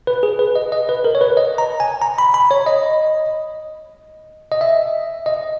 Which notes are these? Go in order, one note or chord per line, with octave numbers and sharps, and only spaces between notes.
B4
G#4
B4
D#5
D#5
B4
A#4
C#5
B4
D#5
A#5
G#5
A#5
B5
B5
C#5
D#5
D#5
E5
D#5